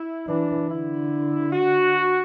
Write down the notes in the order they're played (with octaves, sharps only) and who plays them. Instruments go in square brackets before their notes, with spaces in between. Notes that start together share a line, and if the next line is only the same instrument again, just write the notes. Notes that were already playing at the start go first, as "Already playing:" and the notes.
Already playing: [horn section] E4
[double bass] E3 [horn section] D4
[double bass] D3 [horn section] E4
[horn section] F#4